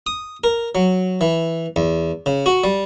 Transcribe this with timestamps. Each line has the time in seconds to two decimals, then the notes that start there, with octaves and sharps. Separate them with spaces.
0.07 D#6
0.44 A#4
0.75 F#3
1.21 E3
1.76 E2
2.26 C#3
2.46 F#4
2.64 G3